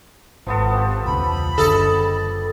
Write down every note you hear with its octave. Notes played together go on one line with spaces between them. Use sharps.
G#1 F3 B3 A4
F3 G4
E1 C#2 B5
F#1 D3 A4 D#5